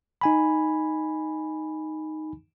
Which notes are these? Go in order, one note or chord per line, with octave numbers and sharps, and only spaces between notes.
D#4 G#5 B5